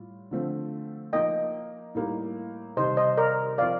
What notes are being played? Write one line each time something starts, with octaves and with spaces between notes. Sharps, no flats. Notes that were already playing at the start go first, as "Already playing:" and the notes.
Already playing: A2 G3 F4
D3 F3 A3 C4 F4
F3 A#3 D#4 D#5 G5
A2 G3 A#3 D#4
C3 D#3 G3 C5 D#5
C5 D#5
A#4 D5
F3 C4 F4 D5 F5